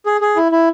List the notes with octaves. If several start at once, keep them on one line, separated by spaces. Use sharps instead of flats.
G#4
G#4
E4
E4